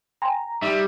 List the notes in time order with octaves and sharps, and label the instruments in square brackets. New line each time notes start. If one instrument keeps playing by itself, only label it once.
[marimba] G5 G#5 C6 [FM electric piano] A#5
[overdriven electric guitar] G3 [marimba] D#4 [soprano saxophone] E5